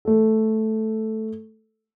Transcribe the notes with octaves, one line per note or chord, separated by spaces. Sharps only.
A3 A4